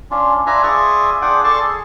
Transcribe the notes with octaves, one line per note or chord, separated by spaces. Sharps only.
C#4 D4 F4
D4 F4 B4 E5 G#5 A#5
F4 G#4 D5 E5 C#6 D#6
D4 F4 G#4 F#5 G5 D6
A4 D5 A5 C6 C#6
G#4